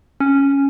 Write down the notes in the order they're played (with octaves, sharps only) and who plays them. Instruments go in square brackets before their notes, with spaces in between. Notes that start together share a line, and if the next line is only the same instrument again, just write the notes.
[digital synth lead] C#4